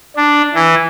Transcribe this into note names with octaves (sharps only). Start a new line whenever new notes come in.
D4
E3